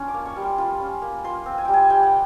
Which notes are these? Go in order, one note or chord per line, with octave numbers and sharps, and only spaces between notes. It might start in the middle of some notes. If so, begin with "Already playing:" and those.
Already playing: C#4 D4 F4
D6
A#3
C#6
G3
C6
F4 B5
C#4
A#3
F4 C6
C4
G#5
G3 G5
G#5
G3 G5
F#5